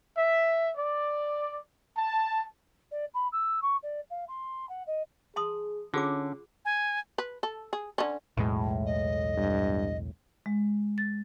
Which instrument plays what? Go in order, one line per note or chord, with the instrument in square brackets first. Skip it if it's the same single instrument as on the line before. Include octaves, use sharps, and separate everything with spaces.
[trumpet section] E5
D5
A5
[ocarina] D5
B5
E6
C#6
D5
F5
C6
F#5
D#5
[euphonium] G#4 [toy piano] A5 C6 D#6
[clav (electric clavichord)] D3 [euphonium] C#4 [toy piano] F4 G#4 D6
[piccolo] G#5
[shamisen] B4
A4
G#4
D3 C#4
[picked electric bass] B1 E2 G#3 [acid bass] A2
[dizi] D#5
[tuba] G2
[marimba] G#3
A6